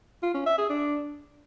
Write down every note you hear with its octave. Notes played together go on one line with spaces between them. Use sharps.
F4
C#4
E5
G#4
D4